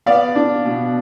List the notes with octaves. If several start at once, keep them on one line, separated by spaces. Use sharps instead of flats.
B3 D5 F5
D4
B2